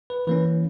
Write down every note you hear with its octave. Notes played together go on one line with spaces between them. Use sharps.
B4
E3 A#3 C#4 B4